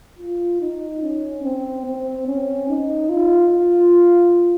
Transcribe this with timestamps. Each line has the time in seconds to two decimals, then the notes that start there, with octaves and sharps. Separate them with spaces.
0.19 F4
0.61 D#4
1.02 C#4
1.43 C4
1.85 C4
2.27 C#4
2.69 D#4
3.09 F4
3.52 F4